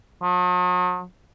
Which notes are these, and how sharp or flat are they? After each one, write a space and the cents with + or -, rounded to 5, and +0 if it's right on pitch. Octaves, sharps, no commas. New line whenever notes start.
F#3 -45